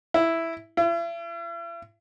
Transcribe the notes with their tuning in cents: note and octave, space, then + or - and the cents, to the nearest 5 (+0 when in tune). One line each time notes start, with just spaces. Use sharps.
E4 +0
E4 +45